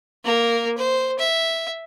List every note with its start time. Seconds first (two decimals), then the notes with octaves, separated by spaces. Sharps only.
0.24 A#3 A#4
0.78 C5
1.19 E5